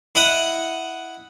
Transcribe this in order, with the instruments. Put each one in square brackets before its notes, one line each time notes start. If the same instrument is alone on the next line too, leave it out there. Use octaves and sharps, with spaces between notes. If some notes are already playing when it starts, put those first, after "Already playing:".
[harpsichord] E4 D#5 F#5